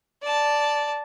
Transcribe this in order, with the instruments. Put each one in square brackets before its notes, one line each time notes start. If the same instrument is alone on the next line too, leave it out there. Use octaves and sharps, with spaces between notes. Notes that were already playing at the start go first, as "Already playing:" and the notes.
[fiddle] D5 A5